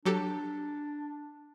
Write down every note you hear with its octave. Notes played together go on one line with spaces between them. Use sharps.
F#3 D4 G4 A4